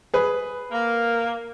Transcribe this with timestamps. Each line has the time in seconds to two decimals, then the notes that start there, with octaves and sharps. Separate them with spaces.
0.14 G#4 B4
0.71 A#3